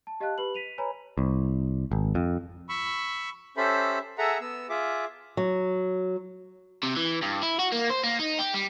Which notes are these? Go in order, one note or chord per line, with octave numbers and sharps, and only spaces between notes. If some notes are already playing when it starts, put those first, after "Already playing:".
A5
G4 D#5 F5 A5 F#6
G4 B4 B5 F#7
B6 D#7 F7
B4 C#5 G#5 A#5 B5
C2
G#1
F2
B5 C#6 E6
C#4 G4 A4 C5 E5 B5
G#4 A4 E5 F#5 A#5
B3 E6
F4 G#4 E5 D6
F#3
C3
E3
G2
E4
F#4
A#3
C5
A#3
D#4
G4
G3